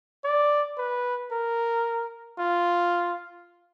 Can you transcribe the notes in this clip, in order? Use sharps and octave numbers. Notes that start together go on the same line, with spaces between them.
D5
B4
A#4
F4